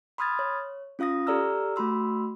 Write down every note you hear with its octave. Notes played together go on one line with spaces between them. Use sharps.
B5 C6 D#6 F6 G#6 A6
C#5
C#4 F4 F5 D#6 A#6
G4 A4 D5 A#5 E6 F6
A3 F#4 B5 C6 E6